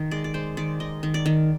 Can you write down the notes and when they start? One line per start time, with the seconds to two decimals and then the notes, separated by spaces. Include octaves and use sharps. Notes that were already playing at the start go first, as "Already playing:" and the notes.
Already playing: D#3
0.11 G#3 D5
0.24 D5
0.34 G#3 C5
0.57 D#3 D5
0.80 D#3 D#5
1.03 D#3
1.14 D5
1.26 D#3